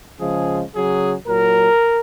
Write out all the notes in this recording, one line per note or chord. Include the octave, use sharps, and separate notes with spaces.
C#3 F3 G#3 G#4
C#3 F#3 G#4
A#2 F#3 A#4